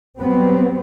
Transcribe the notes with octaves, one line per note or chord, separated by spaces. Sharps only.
F#3 G3 B3 C4